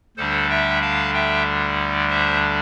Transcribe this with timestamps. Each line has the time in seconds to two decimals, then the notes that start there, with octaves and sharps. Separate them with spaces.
0.17 D2 D3 G3 D4 A4 C5
0.50 E5 G5
0.82 F5 A5
1.14 E5 G5
2.10 C5 E5